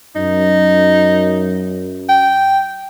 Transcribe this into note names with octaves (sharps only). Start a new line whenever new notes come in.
F#2 D#4
G5